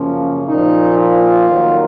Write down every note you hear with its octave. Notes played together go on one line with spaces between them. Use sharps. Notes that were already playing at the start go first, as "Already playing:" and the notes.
Already playing: F#2 C#3 F3 A#3 C#4
A#2 F3 A#3 D#4
F4
F2 D#3 F#3 A#3